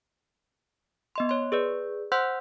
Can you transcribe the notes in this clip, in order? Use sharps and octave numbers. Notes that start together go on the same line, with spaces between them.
B3 D#5 C6
C#5 C6
G#4 B4 D5
C5 F#5 C6 E6 F#6 G6